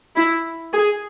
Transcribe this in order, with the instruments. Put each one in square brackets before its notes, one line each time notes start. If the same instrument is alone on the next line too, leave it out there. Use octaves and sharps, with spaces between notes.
[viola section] E4
G#4